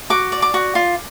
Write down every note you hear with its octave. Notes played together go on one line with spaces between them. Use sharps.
F#4 D6
D5
D6
F#4
F4